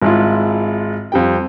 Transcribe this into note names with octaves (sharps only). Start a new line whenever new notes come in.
G#1 G#3 E4 F4
F2 G3 G5